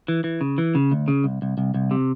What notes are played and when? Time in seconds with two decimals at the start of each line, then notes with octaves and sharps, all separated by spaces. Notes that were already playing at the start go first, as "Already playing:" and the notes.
0.08 E3
0.24 E3
0.41 C#3
0.58 E3
0.75 C#3
0.92 D2
1.08 C#3
1.24 C2
1.42 C2
1.58 C2
1.74 C2
1.91 C3